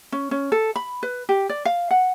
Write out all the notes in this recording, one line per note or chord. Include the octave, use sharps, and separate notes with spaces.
C#4
C#4
A4
B5
B4
G4
D5
F5
F#5